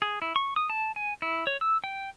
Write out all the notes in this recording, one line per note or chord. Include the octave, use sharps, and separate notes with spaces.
G#4
E4
C#6
D#6
A5
G#5
E4
C#5
E6
G5